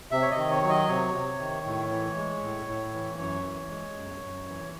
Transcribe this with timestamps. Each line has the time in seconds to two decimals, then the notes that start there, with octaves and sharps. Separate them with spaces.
0.11 C3 E5
0.22 C#5
0.31 D#5
0.37 D#3
0.50 C#5
0.63 F#3
0.69 D#5
0.88 C3 C#5
1.14 C3
1.40 D#3
1.66 A2
1.91 E3
2.16 G#3
2.42 A2
2.68 A2
2.93 E3
3.18 F#2 C#5
3.44 E3
3.70 G#3
3.95 F#2
4.21 F#2
4.47 E3